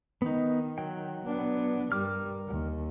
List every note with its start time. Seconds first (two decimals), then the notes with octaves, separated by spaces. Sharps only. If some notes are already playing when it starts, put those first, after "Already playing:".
0.22 D#3 B3 D#4
0.78 F#3 G5
1.25 B3 D4
1.92 G2 G3 A#4 D6 F6
2.47 D#2